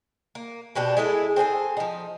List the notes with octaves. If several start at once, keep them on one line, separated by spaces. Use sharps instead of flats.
A#3
B2 C4 D4 G4
G#3 E4 G#4 A4
C4 D4 G#4 A4
F3 D#4